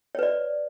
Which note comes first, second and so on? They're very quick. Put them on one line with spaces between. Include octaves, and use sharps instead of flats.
C#5 B4 D5